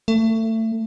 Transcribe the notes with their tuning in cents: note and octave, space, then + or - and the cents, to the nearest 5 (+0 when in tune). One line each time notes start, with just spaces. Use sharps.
A3 +25